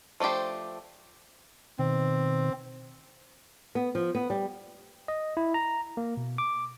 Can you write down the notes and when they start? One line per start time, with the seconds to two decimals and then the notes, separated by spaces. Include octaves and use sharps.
0.20 F3 A3 D4 G4 C5
1.79 B2 D#3 C4
3.75 B3
3.95 F3
4.15 B3
4.30 G3
5.08 D#5
5.37 E4
5.54 A#5
5.97 A#3
6.17 B2
6.38 D6